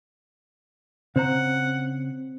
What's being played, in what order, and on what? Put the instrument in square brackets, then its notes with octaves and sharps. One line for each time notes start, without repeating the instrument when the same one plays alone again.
[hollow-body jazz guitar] C#3 C5 A#5 [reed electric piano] C4 [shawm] F#5